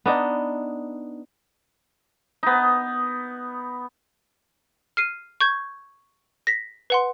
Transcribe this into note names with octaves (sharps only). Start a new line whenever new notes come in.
B3 D4 D#4
B3 D#4
F6 C7 D#7
C#6 G6 G#6
A#6 B6
B4 F#5 C6